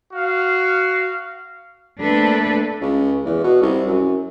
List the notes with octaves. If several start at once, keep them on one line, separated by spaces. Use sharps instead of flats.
F#4 F5
A3 A#3 C4 D4 A4 B4
C#2
E2
B2
C2
F#2